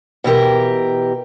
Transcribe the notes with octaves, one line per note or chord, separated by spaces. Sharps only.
B2 E3 G4 A#4